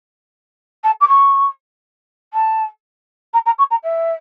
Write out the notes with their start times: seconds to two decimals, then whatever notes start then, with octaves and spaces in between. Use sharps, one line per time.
0.84 A5
1.01 D6
1.08 C#6
2.33 A5
3.33 A#5
3.46 A#5
3.58 C#6
3.71 A#5
3.83 E5